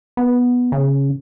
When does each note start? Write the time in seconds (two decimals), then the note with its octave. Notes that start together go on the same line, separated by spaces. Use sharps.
0.17 B3
0.72 C#3